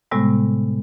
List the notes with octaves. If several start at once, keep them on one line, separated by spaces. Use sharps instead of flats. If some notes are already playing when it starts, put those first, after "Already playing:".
A2 C3 G3 G#3 B3